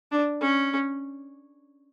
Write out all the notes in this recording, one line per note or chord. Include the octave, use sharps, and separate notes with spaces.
D4
C#4